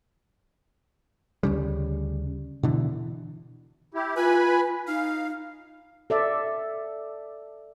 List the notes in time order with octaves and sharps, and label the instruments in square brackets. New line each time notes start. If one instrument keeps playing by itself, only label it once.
[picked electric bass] D2 C#3 G3
B2 D3 E3
[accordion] E4 G4
[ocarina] F4 [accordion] B4 G#5 B5
[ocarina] D#4 [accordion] F5
[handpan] A4 D5 E5